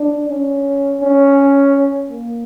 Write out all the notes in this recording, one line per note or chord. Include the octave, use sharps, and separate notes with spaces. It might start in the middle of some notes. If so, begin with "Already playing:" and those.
Already playing: D4
C#4
C#4
A#3